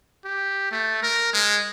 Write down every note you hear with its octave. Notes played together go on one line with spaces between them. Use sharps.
G4
A3
A#4
G#3